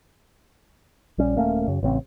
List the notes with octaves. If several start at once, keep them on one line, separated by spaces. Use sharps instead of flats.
A#1 G3 C#4
D#1 A3 A#3 C#4
F#2 C#3
A1 C#3 C4